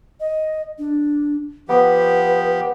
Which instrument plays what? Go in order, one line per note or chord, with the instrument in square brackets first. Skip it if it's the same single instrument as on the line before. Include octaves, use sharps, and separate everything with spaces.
[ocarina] D#5
D4
[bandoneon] F3 G4 [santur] B3 [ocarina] B4